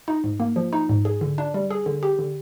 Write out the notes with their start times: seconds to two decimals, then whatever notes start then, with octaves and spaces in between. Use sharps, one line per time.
0.08 D#4
0.24 G#2
0.40 A#3
0.56 F3
0.73 D#4
0.89 G#2
1.05 G#4
1.21 D3
1.38 D4
1.54 G3
1.70 G#4
1.86 D3
2.03 G4
2.19 D3